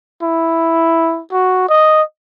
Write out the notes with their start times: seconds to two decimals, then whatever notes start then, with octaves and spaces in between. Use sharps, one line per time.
0.23 E4
1.32 F#4
1.69 D#5